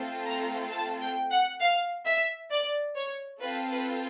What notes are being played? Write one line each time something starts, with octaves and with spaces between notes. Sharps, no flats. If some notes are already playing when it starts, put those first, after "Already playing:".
Already playing: A3 C4 F4 A4
A#5
A5
G5
F#5
F5
E5
D5
C#5
C4 F4 A4 B4
B4